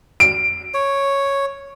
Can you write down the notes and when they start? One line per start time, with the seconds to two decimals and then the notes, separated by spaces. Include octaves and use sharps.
0.20 D7
0.74 C#5